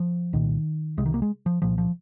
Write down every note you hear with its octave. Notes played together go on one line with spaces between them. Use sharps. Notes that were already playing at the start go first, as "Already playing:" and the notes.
Already playing: F3
C2 A#2 D#3
C2 C3 G#3
D#3
A#3
G#3
F3
C2 A#2 F3
F3